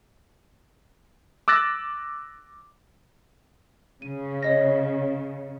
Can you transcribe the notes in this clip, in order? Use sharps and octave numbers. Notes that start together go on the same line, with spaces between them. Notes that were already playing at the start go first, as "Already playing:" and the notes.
D6 E6 F#6 A6 A#6
C#3 D#7
C#5 D#5 A#6